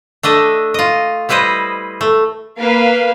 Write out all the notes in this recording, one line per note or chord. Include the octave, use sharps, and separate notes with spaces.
A3 D4 D#5 E5
F4 D#5
G3 E4 B4 C5 D#5
A3
A#3 B4 F5